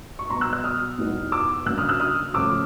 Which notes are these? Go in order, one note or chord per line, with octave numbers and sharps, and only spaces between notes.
C#6
B2 F#3 B3 A#5 C6
E6 F#6
E6 F#6
D#6 F6
E2 B2 G3 B3 D#4
D6 E6
C#3 F#3 A#3 D4 E6 F#6
D#6 F6
E6 F#6
D#6 F6
C#3 F3 A3 C#4 D6 E6